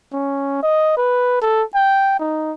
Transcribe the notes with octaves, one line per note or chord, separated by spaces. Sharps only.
C#4
D#5
B4
A4
G5
D#4